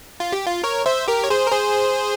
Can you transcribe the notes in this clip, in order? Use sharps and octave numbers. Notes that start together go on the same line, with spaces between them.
F4
G4
F4
A#4 C#5
C5 E5
G4 A#4
C#5
G#4 C5
A#4
G#4 C5